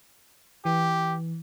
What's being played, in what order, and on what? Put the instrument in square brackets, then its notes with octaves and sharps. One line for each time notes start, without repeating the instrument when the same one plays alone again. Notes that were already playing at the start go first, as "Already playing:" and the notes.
[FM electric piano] E3 [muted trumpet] G4